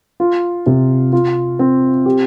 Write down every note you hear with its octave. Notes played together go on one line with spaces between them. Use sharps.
F4
C3
F4
C4
G4